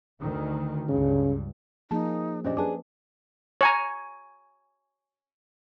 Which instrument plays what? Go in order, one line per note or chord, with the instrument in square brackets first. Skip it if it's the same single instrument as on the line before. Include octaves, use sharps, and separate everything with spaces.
[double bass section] D2 D#3
[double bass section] C#2 G2 [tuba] C#3
[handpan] F3 A#3 G#4 [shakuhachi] D#4 [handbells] A5
[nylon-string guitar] A#2 D4 [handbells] C#4 C5 D#5 [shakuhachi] G4
[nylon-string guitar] D4 G#4 [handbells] B4 A5 D6
[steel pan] C#5 G#5 A#5